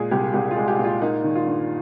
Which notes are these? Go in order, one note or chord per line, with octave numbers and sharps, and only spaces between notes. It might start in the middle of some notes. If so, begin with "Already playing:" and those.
Already playing: A#2 G#3 G#4
C2 G4
C2 G4
F4
G#3
G4
A#2
F4
A#3 D#4
D#3
F4
G2